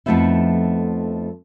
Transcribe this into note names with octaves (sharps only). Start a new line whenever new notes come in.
F2 F3 A3 B3 D#4 E4